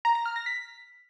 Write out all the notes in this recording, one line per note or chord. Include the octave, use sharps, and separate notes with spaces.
A#5
A#6
F6
A#6
B6